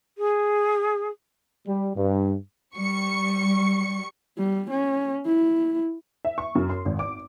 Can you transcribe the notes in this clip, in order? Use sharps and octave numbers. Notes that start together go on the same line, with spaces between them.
G#4
G3
G2
G3 C#6 C#7
G3
C#4
E4
E5
C#6
F#2
C6
G#1
D6